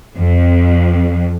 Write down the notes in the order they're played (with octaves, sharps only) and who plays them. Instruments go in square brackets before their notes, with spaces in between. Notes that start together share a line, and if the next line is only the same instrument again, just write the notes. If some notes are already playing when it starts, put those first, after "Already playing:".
[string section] F2